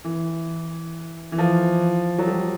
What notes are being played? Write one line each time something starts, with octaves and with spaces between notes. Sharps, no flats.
E3
E3
F3
F#3
G3